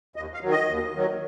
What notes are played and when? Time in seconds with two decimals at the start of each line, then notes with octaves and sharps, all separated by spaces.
0.16 D#2 D#5
0.34 F5
0.42 D#3 F#3
0.51 D#5
0.69 D#2
0.95 D#3 F#3